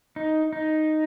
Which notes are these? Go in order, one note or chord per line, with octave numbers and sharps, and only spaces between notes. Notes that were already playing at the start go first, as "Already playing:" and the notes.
D#4
D#4